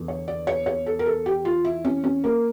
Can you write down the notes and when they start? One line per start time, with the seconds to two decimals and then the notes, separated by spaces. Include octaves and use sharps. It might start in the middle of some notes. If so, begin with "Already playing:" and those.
Already playing: E2 D3
0.08 C#5
0.28 D5
0.47 C#5
0.66 C#5
0.86 A4
0.99 A#4
1.06 A4
1.26 G4
1.45 F4
1.65 E4
1.85 C#4
2.04 C#4
2.24 A#3